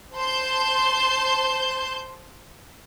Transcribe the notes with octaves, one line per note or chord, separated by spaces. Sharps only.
C5 A5 C6 G6